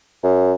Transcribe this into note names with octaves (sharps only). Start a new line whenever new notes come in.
F#2